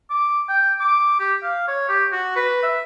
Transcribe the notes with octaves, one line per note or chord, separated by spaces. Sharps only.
D6
G5
D6
G4
F5
C#5
G4
F#4
B4
E5